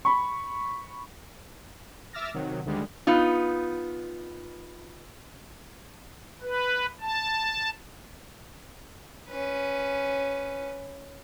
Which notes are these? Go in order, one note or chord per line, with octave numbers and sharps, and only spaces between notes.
B5 C#6
E5 D6 E6 F6 A6 A#6
C3 D#3 F#3
D2 D3 D#3 G3 G#3
B3 D#4 F4
B4
A5
C#4 B4